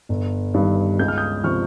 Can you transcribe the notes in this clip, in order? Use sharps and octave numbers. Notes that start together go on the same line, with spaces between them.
G1
G2 D#3 G3
C#2 G6
F6
D#6 G6
C3 F3 C#6 F6